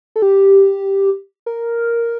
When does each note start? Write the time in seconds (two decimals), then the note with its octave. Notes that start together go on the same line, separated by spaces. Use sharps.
0.16 A4
0.22 G4
1.46 A#4